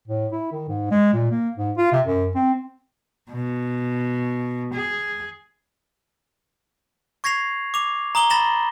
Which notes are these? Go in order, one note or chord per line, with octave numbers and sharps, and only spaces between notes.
A2
E4
D#3
G#2
G#3
A#2
A#3
G#2
F4
C3
F#2
C4
B2
G#4
C#6 G#6 A#6 C7 F7
D6 F7
A#5 D#6 F#7 G7
B5 A6 A#6 E7 F#7